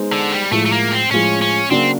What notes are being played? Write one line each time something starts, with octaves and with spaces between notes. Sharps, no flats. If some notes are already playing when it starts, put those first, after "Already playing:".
Already playing: G#3 B3 D#4 G#4 C5
D3
G3
A2 F3 G#3 A3
A3
A#3
C4
A2 F3 G#3 C#4
C#4
C#3 F#3 A#3 C4 D4 F#4